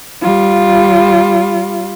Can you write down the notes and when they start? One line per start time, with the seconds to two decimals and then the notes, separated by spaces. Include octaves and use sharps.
0.22 G3 F4